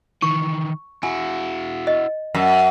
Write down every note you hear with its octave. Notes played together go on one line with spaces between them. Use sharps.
D#3 E3 C#6
E4 F#4 G#5
D#5
F#2